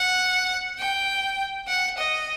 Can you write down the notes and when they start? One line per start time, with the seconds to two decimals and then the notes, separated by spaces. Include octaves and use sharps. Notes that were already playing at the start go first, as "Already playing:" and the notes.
Already playing: F#5
0.79 G5
1.68 F#5
1.98 D#5